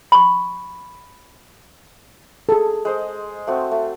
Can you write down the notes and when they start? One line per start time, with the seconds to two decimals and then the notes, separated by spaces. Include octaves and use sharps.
0.12 B5 C#6
2.49 G#4 A4
2.85 G#3 C5 D#5
3.47 A3 C4 F#4
3.71 A3